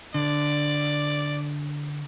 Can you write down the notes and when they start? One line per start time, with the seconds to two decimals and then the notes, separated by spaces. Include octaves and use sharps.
0.14 D3 D5